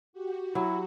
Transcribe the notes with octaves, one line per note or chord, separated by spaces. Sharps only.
F#4 G4
F#3 E4